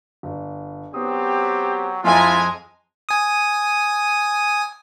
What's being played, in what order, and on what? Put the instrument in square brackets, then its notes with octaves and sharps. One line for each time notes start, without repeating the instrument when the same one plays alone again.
[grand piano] G1
[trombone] F#3 [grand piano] B3 D#6 [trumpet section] C4 G4
[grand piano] F2 D#5 [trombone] G#3 [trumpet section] E4 F4 A4 [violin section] G#5 A#5
[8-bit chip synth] G#5 D#6